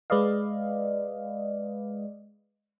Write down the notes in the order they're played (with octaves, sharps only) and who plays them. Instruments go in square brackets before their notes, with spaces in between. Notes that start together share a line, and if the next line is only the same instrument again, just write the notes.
[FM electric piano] G#3 B4 D5 D#5 F5